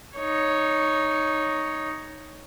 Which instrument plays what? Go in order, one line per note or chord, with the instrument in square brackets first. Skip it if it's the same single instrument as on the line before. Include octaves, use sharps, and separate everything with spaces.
[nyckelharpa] D#4 C#5